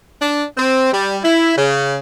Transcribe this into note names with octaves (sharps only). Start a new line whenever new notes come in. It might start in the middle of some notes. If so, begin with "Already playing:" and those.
D4
C4
G3
E4
C#3